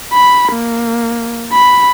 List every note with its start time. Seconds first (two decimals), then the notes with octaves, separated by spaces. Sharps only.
0.13 B5
0.52 A#3
1.53 B5